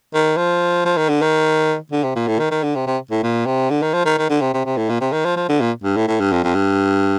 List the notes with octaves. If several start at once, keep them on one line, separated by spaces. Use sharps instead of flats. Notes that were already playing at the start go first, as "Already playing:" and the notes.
D#3
F3
F3
D#3
D3
D#3
D3
C3
A#2
A2
D#3
D#3
D3
C3
C3
A2
A#2
C3
D3
D#3
F3
D#3
D#3
D3
C3
C3
C3
A2
A#2
C3
D#3
F3
F3
D3
A#2
G2
A2
A2
G2
F2
F2
G2